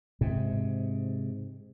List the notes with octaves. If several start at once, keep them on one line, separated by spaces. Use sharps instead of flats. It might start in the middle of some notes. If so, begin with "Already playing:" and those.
G#2 C3